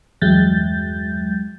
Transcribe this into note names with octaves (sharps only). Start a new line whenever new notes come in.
E2 G2 F#3 G#3 G6 A6